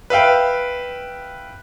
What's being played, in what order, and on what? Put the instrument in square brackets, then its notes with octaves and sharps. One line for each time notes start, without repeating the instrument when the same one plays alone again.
[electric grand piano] B4 E5 F5 G5